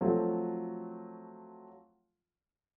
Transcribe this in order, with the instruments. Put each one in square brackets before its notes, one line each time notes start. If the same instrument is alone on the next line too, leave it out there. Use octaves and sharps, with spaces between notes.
[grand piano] F3 F#3 A3 C4 F4 F#4